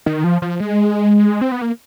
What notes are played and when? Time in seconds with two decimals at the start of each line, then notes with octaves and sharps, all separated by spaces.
0.06 D#3
0.24 F3
0.42 F3
0.60 G#3
1.41 C4
1.52 B3
1.61 A#3